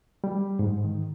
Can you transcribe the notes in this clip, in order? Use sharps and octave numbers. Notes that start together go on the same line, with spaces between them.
G3
G#2
D#3